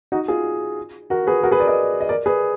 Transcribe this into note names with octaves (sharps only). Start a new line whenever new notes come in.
D#4 F#4
F4 G#4
F#4 A#4
G#4 B4
F#4 A#4
G#4 B4
A#4 D5
B4 D#5
D#5
A#4 D5
G#4 B4